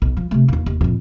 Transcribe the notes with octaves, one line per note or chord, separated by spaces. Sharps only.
B1
F3
C3 A3
D#2 A#3
D#2
F2 A#2